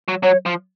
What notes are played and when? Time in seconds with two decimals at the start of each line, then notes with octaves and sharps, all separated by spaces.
0.08 F#3
0.23 F#3 C#5
0.46 F3